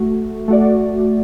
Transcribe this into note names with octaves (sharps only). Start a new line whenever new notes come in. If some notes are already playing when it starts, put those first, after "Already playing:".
Already playing: A3 F#4
A3 F#4 D5